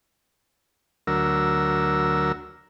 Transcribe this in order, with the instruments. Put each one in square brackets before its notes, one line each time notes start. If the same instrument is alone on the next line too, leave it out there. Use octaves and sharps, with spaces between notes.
[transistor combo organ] D2 F#3 A#4 E6